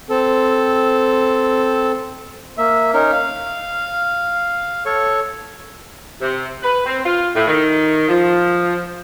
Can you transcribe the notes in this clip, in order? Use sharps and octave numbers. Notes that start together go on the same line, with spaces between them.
C4 A4
A#3 E5
C#4 D#4 A#4
F5
A4 C#5 C#6
C3
B4
C4
F4
A2
D#3
F3